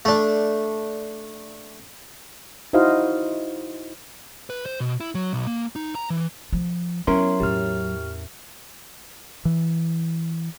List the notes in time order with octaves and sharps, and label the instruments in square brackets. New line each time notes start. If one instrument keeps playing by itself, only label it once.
[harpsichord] A3 D4
[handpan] D#4 E4 F#4 C5 D#5 F5
[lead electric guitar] B4
C5
B2
E4
F#3
B1
A#3
D#4
A#5
E3
[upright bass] F3
[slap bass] F#3 [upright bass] B3 [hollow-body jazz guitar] C#4 E4 A#4 [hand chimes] C6
[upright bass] E2 A2 [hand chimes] G4 F6
[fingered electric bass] E3